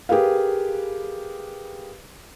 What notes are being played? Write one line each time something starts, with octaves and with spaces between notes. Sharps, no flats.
G4 G#4 A#4 B4 F5